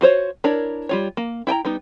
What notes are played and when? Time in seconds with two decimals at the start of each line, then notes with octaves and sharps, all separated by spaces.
0.01 F4 F#4 C5 C#5
0.44 D4 E4 A#4 C#5 D5
0.89 G3 F4 C#5
1.17 A#3
1.47 E4 G5 G#5 A#5
1.65 G3 B3 D#4